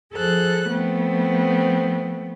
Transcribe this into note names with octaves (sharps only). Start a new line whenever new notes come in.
F3 G#4 A4 C5 F#6
F3 A3 B3 C4